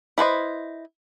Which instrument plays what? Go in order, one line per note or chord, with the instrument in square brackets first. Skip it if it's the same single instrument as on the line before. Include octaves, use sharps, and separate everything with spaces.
[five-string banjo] E4 B4 C5 D#5